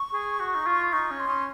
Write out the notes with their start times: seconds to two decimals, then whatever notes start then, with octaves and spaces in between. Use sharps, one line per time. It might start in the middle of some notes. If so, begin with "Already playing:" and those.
Already playing: C#6
0.14 G#4
0.40 F#4
0.55 D#4
0.66 F4
0.93 D#4 C#6
1.11 C#4
1.20 C6
1.28 C#4